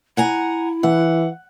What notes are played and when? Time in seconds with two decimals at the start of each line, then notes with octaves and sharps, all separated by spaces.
0.17 E4 F#5 G#5 A#5
0.83 E3 F#5